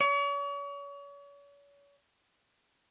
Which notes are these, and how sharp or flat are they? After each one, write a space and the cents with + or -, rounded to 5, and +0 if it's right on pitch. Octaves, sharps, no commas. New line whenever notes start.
C#5 +40